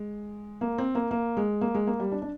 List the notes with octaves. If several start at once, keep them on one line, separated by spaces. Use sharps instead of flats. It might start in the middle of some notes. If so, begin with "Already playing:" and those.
Already playing: G#3
A#3
C4
A#3
A#3
G#3
A#3
G#3
A#3
G3
D4
D4